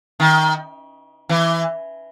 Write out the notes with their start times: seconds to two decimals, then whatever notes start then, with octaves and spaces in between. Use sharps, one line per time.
0.20 D#3
1.29 E3